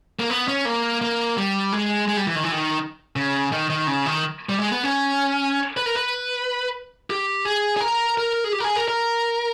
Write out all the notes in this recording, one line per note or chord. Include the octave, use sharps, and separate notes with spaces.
A#3
B3
C#4
A#3
A#3
G3
G#3
G#3
G3
E3
D#3
E3
D#3
C#3
D#3
D#3
C#3
D#3
G3
G#3
B3
C#4
B4
A#4
B4
G4
G#4
G#4
A#4
A#4
G#4
G4
A#4
G#4
A#4
A#4